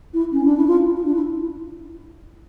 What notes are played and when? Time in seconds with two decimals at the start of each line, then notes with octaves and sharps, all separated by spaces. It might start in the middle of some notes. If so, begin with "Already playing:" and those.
0.13 E4
0.32 C#4
0.44 D4
0.56 E4
0.67 F4
0.96 F4
1.05 D4
1.14 E4